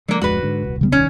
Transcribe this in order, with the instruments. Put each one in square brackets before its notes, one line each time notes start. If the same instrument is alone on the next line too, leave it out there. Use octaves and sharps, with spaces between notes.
[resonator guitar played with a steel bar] D3 A#3 [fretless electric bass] F3 G#3
[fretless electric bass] D1 F2 G#3 [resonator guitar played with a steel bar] F#4 B4
[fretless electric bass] G#2 D3
D#1 C2
[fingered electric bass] C#3 G3 B3
[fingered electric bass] D#3 [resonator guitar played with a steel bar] C#4